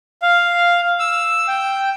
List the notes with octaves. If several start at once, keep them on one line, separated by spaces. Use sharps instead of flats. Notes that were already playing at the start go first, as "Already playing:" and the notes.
F5
E6
G5